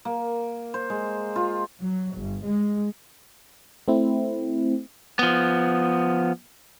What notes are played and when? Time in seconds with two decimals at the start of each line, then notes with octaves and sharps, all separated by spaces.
0.05 A#3
0.74 C5
0.90 G#3
1.36 F4
1.82 F#3
2.16 G1
2.45 G#3
3.88 A3 C4 E4
5.19 F3 B3